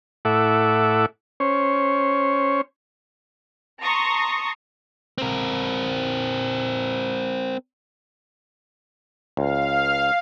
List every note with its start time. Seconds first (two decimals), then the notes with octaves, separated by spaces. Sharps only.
0.25 A2 E4 A4 E5 F#5 D6
1.40 C#4 C5 C#5
3.80 A5 A#5 C6 C#6 D#6
5.18 C4 A#4
9.37 C#2 F5